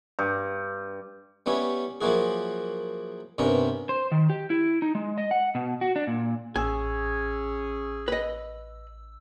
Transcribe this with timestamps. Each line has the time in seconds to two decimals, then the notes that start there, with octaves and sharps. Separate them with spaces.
0.19 G2
1.46 G3 B3 C#4 E4 C#5
2.01 F3 F#3 A#3 E4 F#4 G#4
3.38 G2 C3 B3 C#4 A#4
3.89 C5
4.12 D#3
4.30 G4
4.50 E4
4.82 D#4
4.95 G#3
5.18 D#5
5.31 F#5
5.55 B2
5.81 F#4
5.96 D4
6.07 A#2
6.56 A1 C#4 G#4 G#5 E6
8.08 B4 D#5